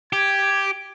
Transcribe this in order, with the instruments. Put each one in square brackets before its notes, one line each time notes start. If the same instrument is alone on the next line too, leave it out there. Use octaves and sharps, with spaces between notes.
[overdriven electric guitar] G4 [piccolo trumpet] G#6